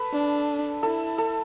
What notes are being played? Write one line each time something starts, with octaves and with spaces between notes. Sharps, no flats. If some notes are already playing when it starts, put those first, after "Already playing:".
Already playing: A4 B4
D4
E4 A4
A4